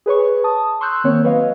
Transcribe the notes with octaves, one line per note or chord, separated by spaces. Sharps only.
G#4 B4 C#5 C#6
A5 D#6
C6 C#6 E6 F#6 G6
D#3 A#3 C4 C#5
F#3 B4 C#5 D#5 F5